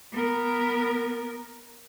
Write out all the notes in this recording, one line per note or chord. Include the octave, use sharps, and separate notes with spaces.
B3 A#4